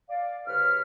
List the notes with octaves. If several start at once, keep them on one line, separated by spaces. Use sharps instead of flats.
D5 F5
C2 C#3 B4 C#5 F6